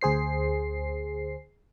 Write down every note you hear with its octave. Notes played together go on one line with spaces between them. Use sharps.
D2 G#4 C5 C7